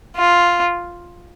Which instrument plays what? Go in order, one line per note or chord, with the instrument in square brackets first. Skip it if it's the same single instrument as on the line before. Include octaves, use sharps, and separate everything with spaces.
[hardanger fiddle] F4